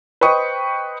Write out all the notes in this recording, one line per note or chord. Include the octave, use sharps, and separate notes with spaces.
B4 C5 D#5 G5 C#6 D#6